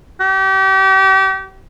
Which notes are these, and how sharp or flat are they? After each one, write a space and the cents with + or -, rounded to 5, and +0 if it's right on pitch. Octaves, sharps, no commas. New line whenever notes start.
G4 -35